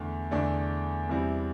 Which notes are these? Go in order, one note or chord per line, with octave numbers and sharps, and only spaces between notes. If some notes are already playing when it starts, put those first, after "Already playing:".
Already playing: E2 D3 A3
E2 D3 A3 D4 D5
E2 C3 G3 C4 E4